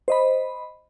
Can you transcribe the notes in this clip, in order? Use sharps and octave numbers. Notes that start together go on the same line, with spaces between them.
C5 D#5 B5